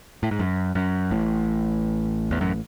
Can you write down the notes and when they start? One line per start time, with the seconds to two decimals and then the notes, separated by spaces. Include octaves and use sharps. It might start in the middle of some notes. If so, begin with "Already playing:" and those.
0.23 A2
0.31 G#2
0.39 F#2
0.75 F#2
1.11 A1 A2
2.31 E2
2.41 F#2